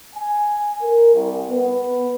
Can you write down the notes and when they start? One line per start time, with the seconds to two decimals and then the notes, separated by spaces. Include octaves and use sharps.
0.16 G#5
0.82 A#4
1.14 C2
1.50 B3